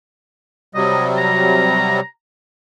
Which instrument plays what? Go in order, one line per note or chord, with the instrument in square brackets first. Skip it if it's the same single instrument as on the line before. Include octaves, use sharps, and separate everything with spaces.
[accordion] C3 F#3 G3 [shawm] D#5
[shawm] A#5